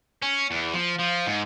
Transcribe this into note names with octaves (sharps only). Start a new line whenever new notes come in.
C#4
E2
F3
F3
G#2